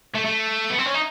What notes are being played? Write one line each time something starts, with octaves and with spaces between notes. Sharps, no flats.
A3
A3
B3
C4
C#4
D#4